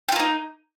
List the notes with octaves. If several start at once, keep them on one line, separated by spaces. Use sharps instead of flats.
A#3 D#4 F4 G4